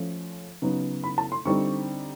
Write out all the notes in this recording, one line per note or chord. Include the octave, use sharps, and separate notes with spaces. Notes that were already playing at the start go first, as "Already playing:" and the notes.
Already playing: F3 A3 C#4
C#3 F#3 B3 D#4
B5
A5
C6
D3 G3 C4 D#4 C#6